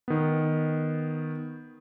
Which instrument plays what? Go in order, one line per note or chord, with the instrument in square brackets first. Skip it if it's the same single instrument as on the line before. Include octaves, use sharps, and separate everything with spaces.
[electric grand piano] D#3 B3